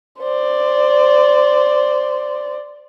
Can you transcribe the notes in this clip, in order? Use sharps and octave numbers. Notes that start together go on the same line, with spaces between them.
C5 D5